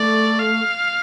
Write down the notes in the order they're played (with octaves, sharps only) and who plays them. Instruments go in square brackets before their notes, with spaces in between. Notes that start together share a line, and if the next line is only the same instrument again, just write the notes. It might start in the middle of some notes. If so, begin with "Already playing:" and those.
Already playing: [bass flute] A3 [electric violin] D5
[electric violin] F5